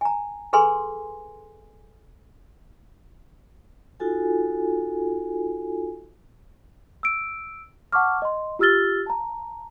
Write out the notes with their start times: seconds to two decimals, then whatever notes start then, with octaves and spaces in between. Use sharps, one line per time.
0.01 G#5 A#5
0.53 G#4 A4 B4 G#5 C6
4.00 D#4 F4 F#4 A4 G#5
7.03 E6 D7
7.92 F#5 A5 C#6 D6 F6
8.22 D#5 C6
8.59 F4 G4 E6 F6 A6 G7
9.06 A5 A#5